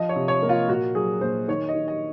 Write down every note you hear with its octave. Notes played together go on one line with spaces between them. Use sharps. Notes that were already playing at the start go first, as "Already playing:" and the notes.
Already playing: F3 D#5
C#5
C3
C#5
A#3
F4
A#2 F#4
F#3 G#4
A#2 C5
D#3 C#5
D#5
D#3
D#5